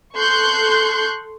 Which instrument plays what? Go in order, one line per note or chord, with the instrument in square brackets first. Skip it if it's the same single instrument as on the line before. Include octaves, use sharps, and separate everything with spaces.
[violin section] A4 C6 C#6 F#6 G6